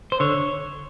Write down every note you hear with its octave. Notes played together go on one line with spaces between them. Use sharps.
C5
D3 C#5